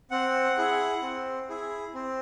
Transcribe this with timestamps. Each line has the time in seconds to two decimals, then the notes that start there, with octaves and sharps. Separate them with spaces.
0.11 C4 F#5
0.58 E4 G#4
1.02 C4
1.49 E4 G#4
1.94 C4